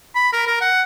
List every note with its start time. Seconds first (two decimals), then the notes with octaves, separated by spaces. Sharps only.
0.15 B5
0.33 A#4
0.47 A#4
0.61 F#5